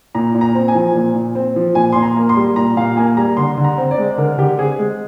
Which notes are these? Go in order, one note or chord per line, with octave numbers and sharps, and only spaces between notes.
A#2 A#5
A#2
A#5
C4
G#5
F3
A#2
A#2
C4
F3
A#2 G#5
A#2 C6
A#5
A#3
C6
G3
A#2 A#5
A#2 F5
A#3 G#5
G3 A#5
D3 C6
D3
A#5
C4
D5
G#3
D3 A#4
D3 G4
C4 G#4
G#3